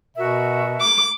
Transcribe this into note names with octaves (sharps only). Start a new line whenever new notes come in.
B2 F#4 A#4 E5
D6